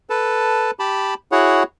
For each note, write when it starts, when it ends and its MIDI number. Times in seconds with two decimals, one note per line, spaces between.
0.10 0.71 69
0.10 0.71 71
0.10 0.71 81
0.79 1.14 67
0.79 1.14 81
0.79 1.14 83
1.32 1.63 64
1.32 1.63 66
1.32 1.63 68
1.32 1.63 73
1.32 1.63 78